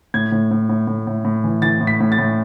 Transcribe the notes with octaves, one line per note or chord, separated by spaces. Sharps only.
A2 G#6
A2
A2
A2
A2
A2
A2
E3
E3 A6
A2
B6
A2
A6
A2